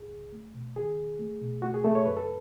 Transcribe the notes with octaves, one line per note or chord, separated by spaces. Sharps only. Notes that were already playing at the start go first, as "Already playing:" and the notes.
Already playing: C#2 G#2 G#4
C#2
A3
B2
D#3 G#4
D#2
A3
B2
A3 F#4
G#4
A3 A4
C#5
F#2 B4
A4